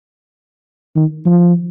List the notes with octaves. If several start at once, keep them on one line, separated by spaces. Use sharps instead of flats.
D#3
F3